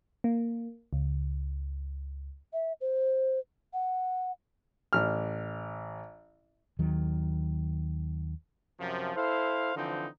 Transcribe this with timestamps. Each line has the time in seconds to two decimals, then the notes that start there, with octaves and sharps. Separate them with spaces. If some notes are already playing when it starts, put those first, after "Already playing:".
0.24 A#3
0.93 C#2
2.53 E5
2.81 C5
3.73 F#5
4.93 A1 F6
6.79 D#2 D#3 F#3
8.80 F#2 C3 F3
9.16 E4 A4 C5 F5
9.76 D3 E3 F3 C4 D#4